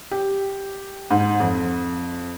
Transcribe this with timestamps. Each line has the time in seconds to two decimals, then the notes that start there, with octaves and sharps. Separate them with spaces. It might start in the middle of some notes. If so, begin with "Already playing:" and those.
0.11 G4
1.10 G#2
1.40 F2